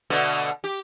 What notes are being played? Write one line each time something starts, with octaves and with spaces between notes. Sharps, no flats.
B2 D3 A3
G4